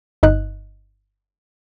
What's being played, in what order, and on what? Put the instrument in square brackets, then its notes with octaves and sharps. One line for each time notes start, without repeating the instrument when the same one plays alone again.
[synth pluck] G1 D#4 F#6